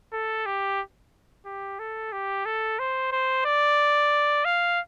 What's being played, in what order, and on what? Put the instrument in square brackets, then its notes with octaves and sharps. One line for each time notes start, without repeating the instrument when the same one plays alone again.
[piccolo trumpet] A4
G4
G4
A4
G4
A4
C5
C5
D5
F5